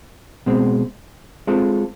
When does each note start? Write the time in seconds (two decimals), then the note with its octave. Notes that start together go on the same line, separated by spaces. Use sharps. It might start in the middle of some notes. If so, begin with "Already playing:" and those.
0.46 B2 G#3 C4
1.47 G#3 C4 F4 A4